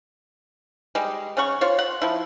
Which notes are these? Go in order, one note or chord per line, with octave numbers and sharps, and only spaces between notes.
G3 G#3
C#3 C#4 F#5 C#6
F4 C5 C#5
F#5
F3 E4